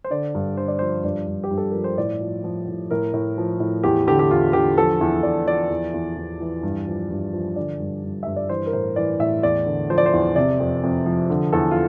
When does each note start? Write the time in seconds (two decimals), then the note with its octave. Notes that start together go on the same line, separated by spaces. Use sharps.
0.04 C5
0.10 D3 D5
0.35 G2
0.57 D3 C5
0.68 D5
0.79 F3 C5
1.04 G2 D5
1.28 G2
1.44 G4
1.51 G2
1.57 A4
1.71 F3 A#4
1.84 C5
1.98 A2 D5
2.21 F3
2.44 F3
2.68 A2
2.91 A2 A#4
3.14 A2
3.38 F3
3.60 A2
3.83 E2 G4
4.07 D3 G4
4.19 G4
4.30 E2 F4
4.53 D3 G4
4.78 F3 A4
5.01 E2
5.23 E2 D5
5.47 F3 D5
5.70 E2
5.94 E2
6.17 E2
6.40 E3
6.63 G2
6.87 F3
7.11 G2
7.33 F3
7.56 D3 D5
7.80 G2
8.04 G2
8.23 G2 E5
8.36 D5
8.49 E3 C5
8.66 A#4
8.73 A2 C5
8.96 E3 D5
9.20 A2 E5
9.43 E2 D5
9.66 D3
9.90 F3 C5
9.98 D5
10.06 C5
10.13 E2
10.36 C3 D5
10.60 F2
10.83 F2
11.06 F3
11.30 D3
11.53 E2 A4
11.71 F4